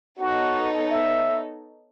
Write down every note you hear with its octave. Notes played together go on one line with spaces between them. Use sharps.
B3 D#4 F#4 A4 C#5
E5